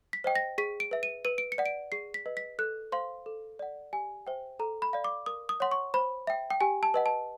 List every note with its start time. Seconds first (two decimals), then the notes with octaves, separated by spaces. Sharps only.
0.13 B6
0.24 C5 D#5 G5
0.36 A#6
0.58 G#4 B6
0.80 D7
0.91 B4 E5
1.03 D#7
1.25 B4 D#7
1.38 D7
1.52 C#7
1.58 D5 F#5
1.66 D7
1.92 G#4 C7
2.14 B6
2.26 B4 D#5
2.37 B6
2.59 A4 F#6
2.92 C5 F5 C6
3.26 A4
3.59 D5 F#5
3.93 G4 G#5
4.27 C5 E5 G5
4.59 A4 A#5
4.82 B5
4.93 D5 F5
5.04 D6
5.26 A#4 D#6
5.49 D#6
5.60 C#5 F#5 C6
5.71 C#6
5.94 C5 B5
6.27 E5 G5
6.50 G5
6.61 G4 G#5
6.83 A5
6.94 B4 D#5 F#5
7.06 A5